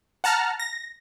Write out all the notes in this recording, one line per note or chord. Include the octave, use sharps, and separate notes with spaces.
F#5 A5 A#5 F6
A#6